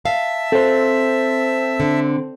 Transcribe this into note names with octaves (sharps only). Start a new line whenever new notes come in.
E5 F5 A5 E6
C4 A4 C5
D3